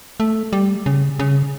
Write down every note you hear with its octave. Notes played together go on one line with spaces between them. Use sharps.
A3
G3
C#3
C#3